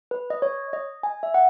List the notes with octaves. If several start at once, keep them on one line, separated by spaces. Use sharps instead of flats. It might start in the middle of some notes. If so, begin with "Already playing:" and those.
B4
D#5
C#5
D#5
G#5
E5
F#5